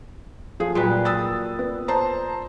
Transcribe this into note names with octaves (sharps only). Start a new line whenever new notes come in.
F3 G#4
A#2 F#3 G3 B4
D#6 E6 A6
B3
C5 A5 A#5